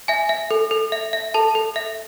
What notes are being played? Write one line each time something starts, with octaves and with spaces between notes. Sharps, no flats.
E5 G#5
E5
A4
A4
E5
E5
A4 A5
A4
E5